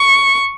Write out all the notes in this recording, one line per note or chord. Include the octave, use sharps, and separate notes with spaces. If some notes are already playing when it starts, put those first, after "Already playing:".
Already playing: C#6